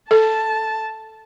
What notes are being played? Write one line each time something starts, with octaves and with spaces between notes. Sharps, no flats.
A4 A5